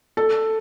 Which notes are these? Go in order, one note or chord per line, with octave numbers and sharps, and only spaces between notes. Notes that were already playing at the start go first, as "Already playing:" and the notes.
A4